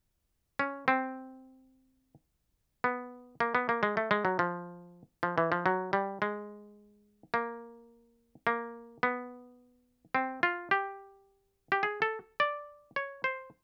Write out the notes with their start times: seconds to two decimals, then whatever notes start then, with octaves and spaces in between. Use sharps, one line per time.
0.59 C#4
0.88 C4
2.84 B3
3.40 A#3
3.55 B3
3.69 A#3
3.83 G#3
3.97 A3
4.11 G#3
4.25 F#3
4.39 F3
5.23 F3
5.38 E3
5.52 F3
5.66 F#3
5.93 G3
6.22 G#3
7.34 A#3
8.47 A#3
9.03 B3
10.15 C4
10.43 F4
10.71 G4
11.72 G4
11.83 G#4
12.02 A4
12.40 D5
12.96 C#5
13.24 C5